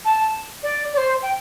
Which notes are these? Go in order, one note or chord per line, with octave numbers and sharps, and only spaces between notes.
A5
D5
D5
C5
G5